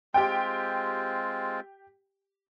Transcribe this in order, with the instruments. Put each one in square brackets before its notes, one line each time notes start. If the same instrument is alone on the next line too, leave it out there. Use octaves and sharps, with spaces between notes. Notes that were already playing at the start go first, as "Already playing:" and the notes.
[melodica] G#3 C4 F4 [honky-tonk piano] G4 G5